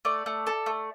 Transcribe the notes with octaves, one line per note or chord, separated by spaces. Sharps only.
A3 D5
A3
A4
A3